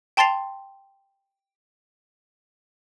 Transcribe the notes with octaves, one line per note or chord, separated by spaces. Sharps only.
G5 A5 C6 A6 C7 F7